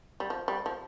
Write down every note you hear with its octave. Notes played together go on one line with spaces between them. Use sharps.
G3
F3
G3
F3